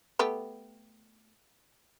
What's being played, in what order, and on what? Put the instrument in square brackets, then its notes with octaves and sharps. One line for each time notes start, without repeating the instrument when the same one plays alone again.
[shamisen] A3 B3 G4